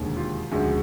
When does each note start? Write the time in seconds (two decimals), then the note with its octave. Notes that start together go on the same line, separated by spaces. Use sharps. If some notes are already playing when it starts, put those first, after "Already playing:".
Already playing: E1 D#2 D3
0.17 F4 G4
0.51 E1 D2 C#3 F3 G#3 F#4